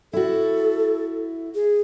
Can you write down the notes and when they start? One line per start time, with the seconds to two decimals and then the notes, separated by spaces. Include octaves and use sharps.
0.13 E4 F#4 A4
1.55 G#4